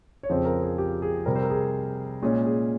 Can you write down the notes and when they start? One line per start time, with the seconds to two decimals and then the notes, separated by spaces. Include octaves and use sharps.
0.23 C#5
0.29 F2 C#3 F3 C4 C5
0.45 A#4
0.62 G#4
0.78 G4
1.02 G#4
1.26 C3 G3 C4 A#4
1.35 C5
1.43 A#4
1.50 G#4
2.22 A#2 G#3 C#4 G#4
2.46 G#4